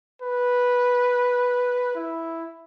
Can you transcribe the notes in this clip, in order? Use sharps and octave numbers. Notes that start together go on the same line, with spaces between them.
B4
E4